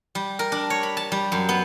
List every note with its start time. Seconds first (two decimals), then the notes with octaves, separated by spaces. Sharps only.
0.15 G3
0.39 A#4
0.52 D4
0.70 C#5
0.83 B5
0.97 A5
1.12 G3
1.32 F#2
1.49 B3